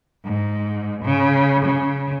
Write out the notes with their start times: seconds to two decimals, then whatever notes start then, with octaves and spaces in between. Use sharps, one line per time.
0.23 G#2
1.03 C#3
1.65 C#3